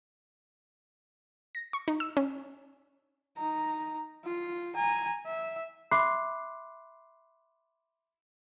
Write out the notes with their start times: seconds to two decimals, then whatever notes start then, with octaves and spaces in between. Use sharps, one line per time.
1.55 A#6
1.73 C#6
1.88 D#4
2.00 E6
2.17 C#4
3.38 D#4 A#5
4.25 F4
4.76 G#5 A#5
5.26 E5
5.91 E5 B5 C6 D6 F#6 C7